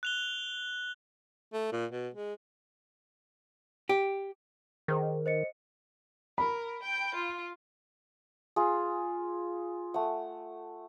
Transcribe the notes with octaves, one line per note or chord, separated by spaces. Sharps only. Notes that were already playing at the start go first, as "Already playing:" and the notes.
F#6 F7 G7
A3
A#2
B2
G#3
G4
D#3 G#4 C5
C5 D#5 C#7
A#4 B5
G5 G6
F4
F4 G#4
A3 F#5